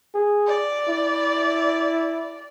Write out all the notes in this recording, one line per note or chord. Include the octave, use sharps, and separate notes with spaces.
G#4
D5
E4